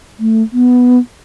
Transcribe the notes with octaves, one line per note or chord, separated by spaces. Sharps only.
A3
B3